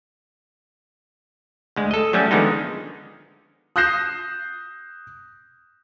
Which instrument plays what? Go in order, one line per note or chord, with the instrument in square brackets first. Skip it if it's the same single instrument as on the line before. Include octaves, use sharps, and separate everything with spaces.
[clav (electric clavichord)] D2 G#3
A4 D#5
F#3 G3 A3 C#4
D3 D#3 F3 G#3 B3 D#4
[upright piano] D#6 F#6 G6 A#6 C7 E7